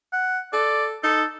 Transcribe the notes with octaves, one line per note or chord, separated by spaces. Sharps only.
F#5
A4 D5
D#4 A4